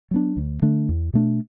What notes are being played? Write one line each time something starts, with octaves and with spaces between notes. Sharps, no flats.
F#3 B3 D4
D2
D3 A3 D4
E2
B2 A3 D4